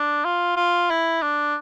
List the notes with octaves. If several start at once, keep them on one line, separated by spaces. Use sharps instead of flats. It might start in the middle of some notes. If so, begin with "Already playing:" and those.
Already playing: D4
F4
F4
E4
D4